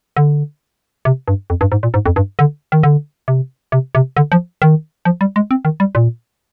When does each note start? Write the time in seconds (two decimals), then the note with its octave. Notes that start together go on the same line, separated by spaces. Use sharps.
0.17 D3
1.05 C3
1.28 G2
1.50 F2
1.61 G2
1.72 G#2
1.83 A#2
1.94 G#2
2.06 F2
2.16 G2
2.39 D3
2.72 D#3
2.83 D3
3.28 C3
3.72 C3
3.95 C3
4.17 D3
4.32 F3
4.62 D#3
5.05 F3
5.21 G3
5.36 G#3
5.51 C4
5.65 D#3
5.80 G3
5.95 A#2